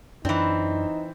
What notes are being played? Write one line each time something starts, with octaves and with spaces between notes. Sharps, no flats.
F#2 E3 C4 D4 D#4